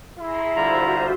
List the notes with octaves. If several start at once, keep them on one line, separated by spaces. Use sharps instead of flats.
E4 G#4 A#5 C6
D3 G3 F4 F#4 C5 E5 A#5